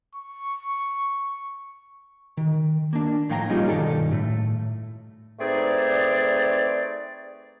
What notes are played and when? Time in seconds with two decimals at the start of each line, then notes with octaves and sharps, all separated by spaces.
0.15 C#6
2.37 D#3
2.93 A#3 D4
3.30 A2 F3 F5 G5 A5 A#5
3.50 G3 A#3 C#4 D#4 F4 G#4
3.68 B1 G2 C3 D#3 A4 D5
4.11 A2 A3
5.39 A3 C4 D#4 G#4 B4 D5